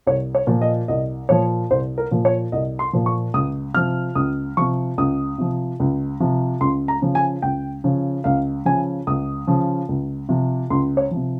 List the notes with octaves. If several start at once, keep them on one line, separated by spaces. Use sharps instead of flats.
C2 C#5
C#5
A#2 F3
D#5
C2 D#5
A#2 F3 C#5
C2 C5
A#4
A#2 F3
C#5
C2 D#5
C6
A#2 F3
C#6
C#2 D#6
C3 F3 F6
C#2 D#6
C3 F3 C#6
C#2 D#6
C3 F3
C#2
C3 F3
C#2 C6
A#5
C#3 F3
G#5
C#2 G5
C#3 F3
C#2 F5
C#3 F3 G#5
C#2 D#6
C#3 F3
C#2
C3 F3
C#2 C6
C#5
C3 F3